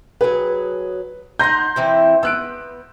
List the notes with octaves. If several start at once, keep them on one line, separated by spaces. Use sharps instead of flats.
F#3 G#4 B4
D#4 F#5 A#5 C6 G6 A#6
E3 C4 E4
B3 E6 F#6 D7